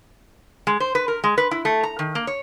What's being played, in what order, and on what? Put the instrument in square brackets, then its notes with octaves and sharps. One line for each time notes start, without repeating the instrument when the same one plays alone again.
[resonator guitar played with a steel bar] G#3
C5
B4
A#4
G#3
B4
E4
A3
A#5
D#3
A#3
C#5